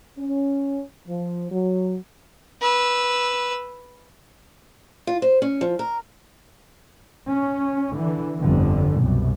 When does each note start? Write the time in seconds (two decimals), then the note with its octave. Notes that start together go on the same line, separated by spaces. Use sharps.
0.18 C#4
1.07 F3
1.51 F#3
2.61 B4 E6
5.07 F4
5.22 C5
5.42 C#4
5.61 F3
5.79 A#4
7.28 C#4
7.94 D3 E3
8.40 G1 F2 D3
8.99 C2 F#2 B2